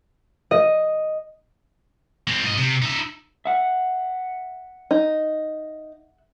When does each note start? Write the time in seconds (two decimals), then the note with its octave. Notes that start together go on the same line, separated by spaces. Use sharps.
0.51 D#5
2.28 G#3 C4
2.44 G#2 D#5
2.58 C3
2.82 D#4 E5
3.45 E5 F#5
4.91 D#4